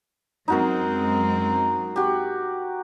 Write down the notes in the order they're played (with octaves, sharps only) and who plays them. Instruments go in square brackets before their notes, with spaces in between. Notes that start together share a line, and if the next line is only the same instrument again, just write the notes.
[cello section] F#2 G#3 C4 [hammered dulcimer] D#4 F#4 A#4
[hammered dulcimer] F#4 G4